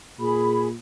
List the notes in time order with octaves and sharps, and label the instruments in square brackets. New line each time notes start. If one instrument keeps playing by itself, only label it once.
[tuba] A#2 [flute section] G#4 B5